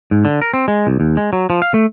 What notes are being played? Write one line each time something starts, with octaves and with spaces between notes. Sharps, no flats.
G#2
D3
A#4
C4
G#3
C2
D#2
G#3
F#3
F3
F5
A3